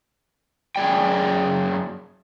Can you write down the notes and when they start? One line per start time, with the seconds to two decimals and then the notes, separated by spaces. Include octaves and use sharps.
0.76 F#2 G#4 D5 G5